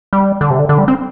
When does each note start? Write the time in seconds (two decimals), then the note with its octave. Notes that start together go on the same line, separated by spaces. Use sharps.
0.13 G3
0.41 D3
0.50 C3
0.59 D3
0.69 D3
0.78 G3
0.88 C4